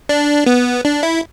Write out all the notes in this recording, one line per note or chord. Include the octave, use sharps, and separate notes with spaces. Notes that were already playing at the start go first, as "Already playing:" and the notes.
D4
B3
D4
E4